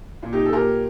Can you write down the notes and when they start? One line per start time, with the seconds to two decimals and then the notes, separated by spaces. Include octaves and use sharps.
0.23 A#2
0.33 D#4 G4
0.45 A4
0.53 A#2 G4 A#4